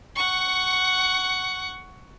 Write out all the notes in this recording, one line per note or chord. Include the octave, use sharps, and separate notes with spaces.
F#5 C#6